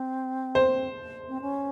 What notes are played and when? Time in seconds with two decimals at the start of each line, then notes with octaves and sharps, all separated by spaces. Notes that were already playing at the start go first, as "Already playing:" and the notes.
Already playing: C4
0.55 C5
1.29 C4
1.41 C#4